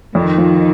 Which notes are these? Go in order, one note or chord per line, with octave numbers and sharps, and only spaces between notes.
F2 D#3
F3